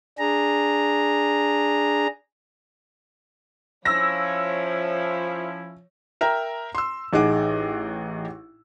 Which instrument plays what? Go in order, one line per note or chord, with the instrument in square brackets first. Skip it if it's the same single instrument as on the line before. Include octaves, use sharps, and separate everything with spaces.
[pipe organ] D4 G#4 A#5
[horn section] F3 [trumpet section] C#4 E4 [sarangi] C#5 [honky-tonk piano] E6 A#6
[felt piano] A#4 E5 G5 A#5
C6 E6
A1 D#4 G#4 F#5 D6